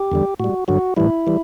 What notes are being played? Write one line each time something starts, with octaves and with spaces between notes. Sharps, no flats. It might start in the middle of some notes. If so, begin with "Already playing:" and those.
Already playing: G4
E2 D3 G3
A2 G3 F#4
G2 D3 F#3 F#4
A2 E3 G3 E4
E3 G3